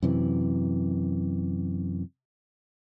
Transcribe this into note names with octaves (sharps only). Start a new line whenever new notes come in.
F#2 C3 E3